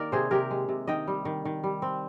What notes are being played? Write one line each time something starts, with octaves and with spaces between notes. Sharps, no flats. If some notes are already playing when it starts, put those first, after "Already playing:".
Already playing: D#3 A#3 A#4 D5
C3 G#4 C5
C3 G4 A#4
G#3
C3
D#3 D#5 G5
G3
D#3
D#3
G3
C4